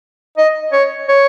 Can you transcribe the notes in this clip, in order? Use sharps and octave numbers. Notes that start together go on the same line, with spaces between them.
D#5
C#5
C#5